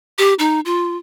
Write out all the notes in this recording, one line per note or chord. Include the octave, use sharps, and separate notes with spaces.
G4
D#4
F4